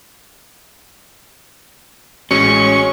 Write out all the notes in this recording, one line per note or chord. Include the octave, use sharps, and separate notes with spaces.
A1 G#3 C#4 F#4 C#5 C#6